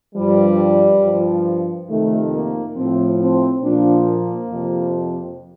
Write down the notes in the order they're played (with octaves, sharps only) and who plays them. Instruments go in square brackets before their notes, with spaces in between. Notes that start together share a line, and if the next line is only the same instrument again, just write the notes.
[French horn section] G2 F3 G3
G2 F3
F2 C3 D#3 A3
A#3
A2 F3 C4
C4
A#2 F3 D4
A#3
F2 C3 F3